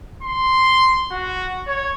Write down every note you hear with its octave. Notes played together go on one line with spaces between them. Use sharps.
C6
F#4
C#5